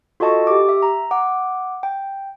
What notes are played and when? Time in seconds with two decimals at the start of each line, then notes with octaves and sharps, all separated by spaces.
0.20 F4 F#4 A4 D#5 A5 C#6
0.47 G4 D6
0.69 E5
0.82 A#5
1.11 F#5 D6
1.83 G5